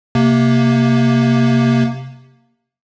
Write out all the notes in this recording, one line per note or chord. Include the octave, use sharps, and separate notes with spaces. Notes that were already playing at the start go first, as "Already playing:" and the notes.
C3 A#3